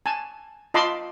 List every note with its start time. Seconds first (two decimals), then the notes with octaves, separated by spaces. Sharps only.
0.06 G#5 A5
0.74 F4 D#5 A5 B5 C6 D6